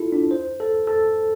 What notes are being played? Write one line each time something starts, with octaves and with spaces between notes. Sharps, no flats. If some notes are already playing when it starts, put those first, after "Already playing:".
Already playing: E4 F4 A4
D4
C5
A4
A4